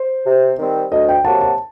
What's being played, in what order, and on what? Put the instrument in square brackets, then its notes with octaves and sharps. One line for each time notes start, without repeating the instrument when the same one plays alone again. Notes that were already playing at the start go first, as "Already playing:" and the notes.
Already playing: [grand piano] C5
[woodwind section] C3
D#3 G3 C4
[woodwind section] D2 [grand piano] D#5
[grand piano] G5
[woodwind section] C3 F#3 A#3 F#4 [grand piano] A5
[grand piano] A5